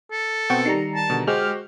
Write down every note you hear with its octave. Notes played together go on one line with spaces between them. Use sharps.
A4
B2 B3 C4 F#4 G5 C#6
D#3 G3 A#5 C7 C#7
A5
B2 D3
G#3 F#4 G4 C5 F6